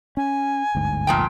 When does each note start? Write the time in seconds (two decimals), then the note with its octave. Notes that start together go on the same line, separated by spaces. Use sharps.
0.17 C#4 G#5
0.75 G1 D2 G#2
1.07 A#2 F3 G5